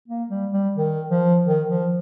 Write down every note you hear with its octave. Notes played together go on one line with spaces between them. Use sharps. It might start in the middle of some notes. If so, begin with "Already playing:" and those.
A#3
G3
G3
D#3
F3
D#3
F3